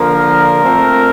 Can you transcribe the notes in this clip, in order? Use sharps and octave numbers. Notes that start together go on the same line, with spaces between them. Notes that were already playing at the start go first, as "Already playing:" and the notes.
Already playing: D3 F3 A#3 A#4
A#2 A3 C4